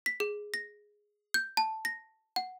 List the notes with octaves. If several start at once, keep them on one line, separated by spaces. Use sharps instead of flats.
B6
G#4
A#6
G6
A5
A#6
F#5